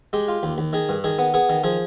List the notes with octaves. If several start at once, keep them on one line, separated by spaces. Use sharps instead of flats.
G#3 G4
F4
D#2
D#2
D#3 G#4
G2
D#3 G#4
B3
B3 G#4
D#3
F3 G#4